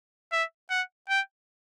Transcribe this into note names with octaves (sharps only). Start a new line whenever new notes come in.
E5
F#5
G5